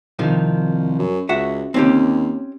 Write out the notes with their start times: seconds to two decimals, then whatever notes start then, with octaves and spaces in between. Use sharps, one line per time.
0.19 C2 C3 D#3 F3
0.99 F#2
1.29 C#2 F#4 E5 F#5
1.74 D#2 C4 C#4 G4